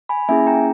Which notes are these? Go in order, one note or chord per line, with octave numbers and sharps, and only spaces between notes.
G#5 B5
A#3 C#4 E4 G#4 E5 G#5
G5 A#5